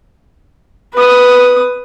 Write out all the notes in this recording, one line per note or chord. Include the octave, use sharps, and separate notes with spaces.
B4 D#6